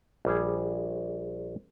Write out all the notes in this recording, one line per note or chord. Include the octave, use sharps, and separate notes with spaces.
A#1 G3 G#4